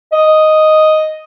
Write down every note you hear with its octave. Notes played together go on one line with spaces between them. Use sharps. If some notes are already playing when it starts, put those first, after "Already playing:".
D#5